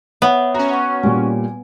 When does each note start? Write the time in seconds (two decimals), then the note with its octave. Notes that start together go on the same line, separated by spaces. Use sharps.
0.22 B3 C#5 E5 F#5
0.54 C#4 F#4 A#5
0.74 C#6
1.03 A#2 G3 G#5